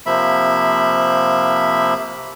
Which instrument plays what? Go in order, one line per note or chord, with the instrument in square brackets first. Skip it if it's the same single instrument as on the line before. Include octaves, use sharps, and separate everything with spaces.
[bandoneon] C3 F3 A#3 E5 B5